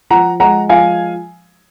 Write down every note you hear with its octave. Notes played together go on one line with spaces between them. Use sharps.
F3 F#5 A#5
G#3 F#5 A#5
F3 F5 G#5